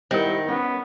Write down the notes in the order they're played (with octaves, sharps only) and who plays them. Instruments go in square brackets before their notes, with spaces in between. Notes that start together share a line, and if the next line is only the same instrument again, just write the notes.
[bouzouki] D#3 [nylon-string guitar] G3 E4 F#5 [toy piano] A#4 C5
[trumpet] B3 [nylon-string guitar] C#4